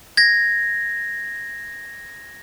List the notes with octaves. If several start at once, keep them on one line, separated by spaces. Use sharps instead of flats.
G#6 A#6